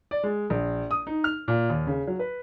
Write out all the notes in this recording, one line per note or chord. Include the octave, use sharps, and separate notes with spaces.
D5
G#3
A#1
D#6
D#4
F6
A#2
D#2
C#3
F#3
B4